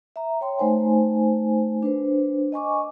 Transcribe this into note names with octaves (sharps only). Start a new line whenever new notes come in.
E5 A#5
C#5 G5 C6
A3 D#4 C5 G#5
D4 B4 C5
D#5 G#5 C#6 D6